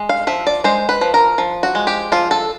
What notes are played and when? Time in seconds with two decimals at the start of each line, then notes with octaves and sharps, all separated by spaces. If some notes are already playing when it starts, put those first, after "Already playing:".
Already playing: G#3
0.09 F5
0.27 F3 E5
0.47 D5
0.64 G#3 C5
0.89 B4
1.01 F3
1.14 A#4
1.38 F3
1.63 F#4
1.75 G#3
1.87 G4
2.12 F3 F4
2.31 A4